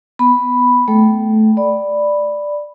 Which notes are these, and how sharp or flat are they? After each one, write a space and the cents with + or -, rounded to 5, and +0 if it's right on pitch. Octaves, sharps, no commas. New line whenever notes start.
B3 +0 B5 +0
A3 -20 A4 -20 G5 -20
D5 +5 B5 +0